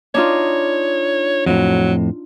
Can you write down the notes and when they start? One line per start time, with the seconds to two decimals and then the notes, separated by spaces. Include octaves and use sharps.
0.15 D4 D#4 F4 C#5
1.46 F2 A2 F#3